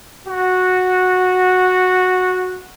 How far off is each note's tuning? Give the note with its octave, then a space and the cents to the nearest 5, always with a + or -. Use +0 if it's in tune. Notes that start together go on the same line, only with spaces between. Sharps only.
F#4 -10